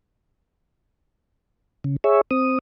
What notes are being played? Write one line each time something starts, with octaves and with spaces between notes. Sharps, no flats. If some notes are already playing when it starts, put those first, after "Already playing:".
C#3
G#4 C#5 E5
C4 D#6